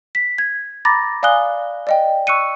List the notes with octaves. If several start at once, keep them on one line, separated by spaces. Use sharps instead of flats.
B6
G#6
A#5 B5 D6 A6 A#6
D5 F5 G#5 D#6 F#6 G7
D5 D#5 G5
C#6 E6 F#6 C#7 D#7